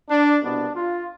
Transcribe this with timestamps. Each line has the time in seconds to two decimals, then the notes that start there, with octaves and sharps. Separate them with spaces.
0.10 D4
0.42 C2 B2 B3 D4
0.75 F4